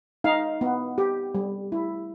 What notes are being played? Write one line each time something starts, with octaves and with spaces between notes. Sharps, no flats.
D#4 F5
B3
G4
G3
E4